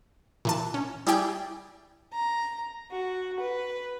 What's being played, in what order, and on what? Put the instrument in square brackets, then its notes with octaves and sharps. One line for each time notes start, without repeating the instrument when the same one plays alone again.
[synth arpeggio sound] A#2 E3 A5
C#4
G3 E4 G4 G#4 D5 G5
[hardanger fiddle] A#5
F#4
B4